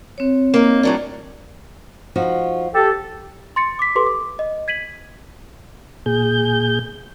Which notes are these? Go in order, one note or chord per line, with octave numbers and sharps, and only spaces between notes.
C4 C#5
A#3 D#4
A2 F#3 D4
F3 D#4 F#4
G4 A4
C6 A6 C#7
D6 B6
G4 A4 B4 C6 D6
D6
D#5
G#6 B6 D#7 F#7
A#2 G#4 G6